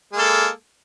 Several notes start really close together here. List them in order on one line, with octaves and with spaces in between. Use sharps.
G#3 A#3 A4